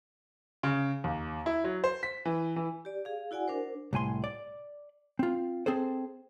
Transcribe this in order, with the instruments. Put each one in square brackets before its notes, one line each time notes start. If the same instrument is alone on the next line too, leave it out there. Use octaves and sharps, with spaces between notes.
[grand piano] C#3
D#2
E4
F#3
C5
B6
E3
E3
[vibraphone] G4 D5
G#4 F5
E4 F#4 D5 F#5 G#5
D4 A#4 C5
[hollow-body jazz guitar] C2 A2 G#5 C6
D5
C4 F4
C4 G#4 A4 C5